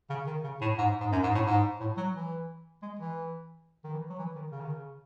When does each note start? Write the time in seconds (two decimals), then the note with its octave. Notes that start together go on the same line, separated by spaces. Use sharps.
0.10 C#3
0.27 D#3
0.44 C#3
0.61 A2
0.78 G#2
1.00 G#2
1.12 F#2
1.23 G#2
1.35 A2
1.46 G#2
1.80 A2
1.97 F#3
2.14 E3
2.82 G#3
2.99 E3
3.84 D#3
3.93 E3
4.10 F#3
4.19 E3
4.36 D#3
4.52 C#3
4.61 D#3
4.70 C#3